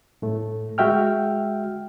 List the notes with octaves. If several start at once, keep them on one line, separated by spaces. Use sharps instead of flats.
A2 A3
G#3 F#4 E5 G5 F6